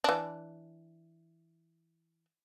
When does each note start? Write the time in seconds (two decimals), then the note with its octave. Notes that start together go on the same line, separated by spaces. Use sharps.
0.04 E3 D4